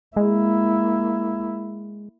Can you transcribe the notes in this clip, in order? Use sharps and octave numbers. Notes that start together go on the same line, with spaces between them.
G#3 A#3 E4